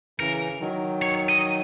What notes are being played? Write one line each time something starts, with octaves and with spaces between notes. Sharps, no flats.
C#3 E3 A#4
D#3 F#3
C#5
D#5